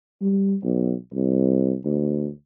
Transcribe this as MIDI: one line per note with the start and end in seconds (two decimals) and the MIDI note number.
0.21 0.55 55
0.63 0.94 35
1.13 1.76 36
1.85 2.29 38